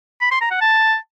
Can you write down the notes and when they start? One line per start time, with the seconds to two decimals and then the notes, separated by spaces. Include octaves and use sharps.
0.21 B5
0.31 C6
0.41 A#5
0.51 F#5
0.61 A5